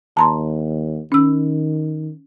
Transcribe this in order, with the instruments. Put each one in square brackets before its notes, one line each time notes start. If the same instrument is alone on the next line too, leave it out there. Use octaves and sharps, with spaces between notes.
[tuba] D#2 [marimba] A5 A#5 C6
[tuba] D#3 [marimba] C#4 E6